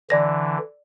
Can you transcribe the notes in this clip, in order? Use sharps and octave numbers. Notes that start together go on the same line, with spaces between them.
D3 E3 D5 A#6